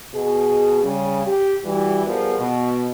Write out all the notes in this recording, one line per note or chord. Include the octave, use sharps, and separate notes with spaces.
B2 G#4
C#3 G3
G4
E3 G3 F#4
B2 F3 G3 B3 G#4 A#4
B2